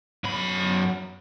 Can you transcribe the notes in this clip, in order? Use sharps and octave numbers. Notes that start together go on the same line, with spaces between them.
F#2 B5